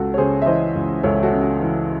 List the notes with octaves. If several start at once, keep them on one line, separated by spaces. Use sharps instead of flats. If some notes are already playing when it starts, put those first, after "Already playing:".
Already playing: C#2 F#4 A4
C#5
C#3 G#4 C5
E5
E3 C5 D#5
C#2
C#2 A4 C#5
F#4 A4
C#3
F#4
E3